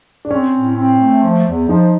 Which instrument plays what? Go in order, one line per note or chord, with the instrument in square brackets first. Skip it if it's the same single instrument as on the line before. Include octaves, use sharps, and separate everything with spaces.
[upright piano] D4
[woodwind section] C4 [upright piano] C#4
[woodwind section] A2
C4
A3
F3
E2
[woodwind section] F3 [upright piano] D#4